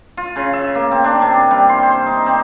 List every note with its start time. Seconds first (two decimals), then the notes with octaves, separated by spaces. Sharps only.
0.17 F4
0.36 C#3
0.53 E5
0.75 A#3
0.91 C4
1.04 D4
1.22 C3
1.51 G3
1.69 C6
1.83 C5
2.06 D#4
2.26 C4